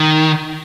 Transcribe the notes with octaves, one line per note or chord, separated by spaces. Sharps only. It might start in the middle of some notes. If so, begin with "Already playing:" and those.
Already playing: D#3